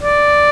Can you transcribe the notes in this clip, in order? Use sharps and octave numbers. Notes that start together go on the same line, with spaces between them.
D5